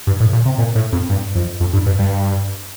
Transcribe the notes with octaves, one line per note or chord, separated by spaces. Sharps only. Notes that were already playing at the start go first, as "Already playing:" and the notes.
G2
A2
A#2
C3
A#2
A2
F2
G2
F2
F2
G2
G2
G2